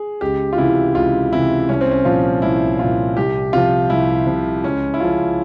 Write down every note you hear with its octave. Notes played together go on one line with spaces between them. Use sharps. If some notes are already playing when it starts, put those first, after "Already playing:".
Already playing: G#4
C#2 G4
F4
C3 E3 E4
C#2 F4
C3 E3 E4
C2 C#4
C4
C#4
A#2 F3 F4
C2 E4
A#2 F3 F4
C2 G4
C3 F3 F4
C2 E4
C3 F3
C#2 C#4
E4
C#3 F3 F4